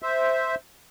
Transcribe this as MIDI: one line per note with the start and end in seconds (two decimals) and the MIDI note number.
0.03 0.55 72
0.03 0.55 76